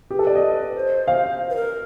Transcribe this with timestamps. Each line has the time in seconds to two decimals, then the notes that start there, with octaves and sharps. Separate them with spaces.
0.11 G4 B4
0.19 A4
0.27 D5
0.35 D#5
0.75 C5
1.08 F5
1.50 B4
1.56 A#4